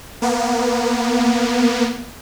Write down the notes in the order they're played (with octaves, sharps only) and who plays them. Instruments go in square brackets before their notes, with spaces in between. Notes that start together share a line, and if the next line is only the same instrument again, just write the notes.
[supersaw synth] A#3 B3